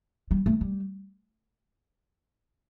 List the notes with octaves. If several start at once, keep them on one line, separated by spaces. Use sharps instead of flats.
G3
A3
G3